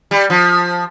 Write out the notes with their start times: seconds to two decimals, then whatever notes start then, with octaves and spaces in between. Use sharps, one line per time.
0.11 G3
0.30 F3